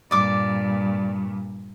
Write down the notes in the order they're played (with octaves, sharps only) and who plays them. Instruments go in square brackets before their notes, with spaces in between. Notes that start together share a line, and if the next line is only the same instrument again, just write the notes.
[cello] G2 A#2 [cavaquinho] D5 D6